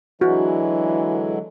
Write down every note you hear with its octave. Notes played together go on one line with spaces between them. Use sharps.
D3 E3 F#3 G#3 F#4